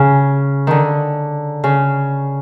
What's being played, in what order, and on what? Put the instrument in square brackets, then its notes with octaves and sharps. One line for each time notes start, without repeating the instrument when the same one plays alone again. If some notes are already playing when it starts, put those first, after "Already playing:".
Already playing: [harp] C#3
D3 D#3
C#3